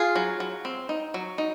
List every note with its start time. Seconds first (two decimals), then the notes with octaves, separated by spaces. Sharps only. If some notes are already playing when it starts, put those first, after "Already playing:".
Already playing: F4 G#4
0.16 F#3
0.40 F#3
0.65 C4
0.89 D#4
1.14 F#3
1.38 D#4